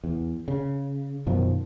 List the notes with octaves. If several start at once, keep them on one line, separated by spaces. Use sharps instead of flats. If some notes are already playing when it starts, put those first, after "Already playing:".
E2
C#3
F#2 B2 D#3 F3